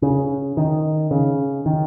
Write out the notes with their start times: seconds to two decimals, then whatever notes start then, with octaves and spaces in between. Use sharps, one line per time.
0.02 C#3
0.57 D#3
1.11 C#3
1.66 D#3